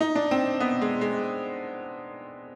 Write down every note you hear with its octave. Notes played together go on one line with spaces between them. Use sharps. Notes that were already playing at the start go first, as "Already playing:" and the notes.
D#4
D4
C4
B3
G#3
G#3